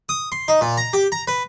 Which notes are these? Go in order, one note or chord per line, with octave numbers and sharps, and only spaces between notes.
D#6
C6
D#4
A#2
A#5
G4
A#5
B4